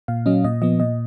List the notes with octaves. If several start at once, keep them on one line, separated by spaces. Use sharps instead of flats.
A#2 F5
F#3 C#4 D#5
A#2 D#5
F3 B3 D#5
A#2 D#5